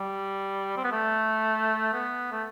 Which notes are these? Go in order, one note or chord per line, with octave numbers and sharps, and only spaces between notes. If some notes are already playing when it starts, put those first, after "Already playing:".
Already playing: G3
C4
B3
A3
B3
A3